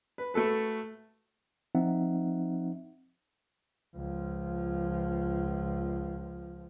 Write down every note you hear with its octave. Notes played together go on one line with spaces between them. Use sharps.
B4
A3 F#4 A4 B4
F3 C4 D#4 E5 F#5
C#2 F3